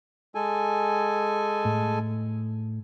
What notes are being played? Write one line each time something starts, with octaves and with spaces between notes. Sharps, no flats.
G#3 A4 G#5
A2